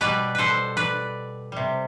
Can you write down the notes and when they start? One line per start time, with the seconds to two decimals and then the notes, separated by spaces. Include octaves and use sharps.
0.01 B2 G3 B4 D5
0.35 A4 B4 C5
0.77 B4 D5
1.52 C3 G3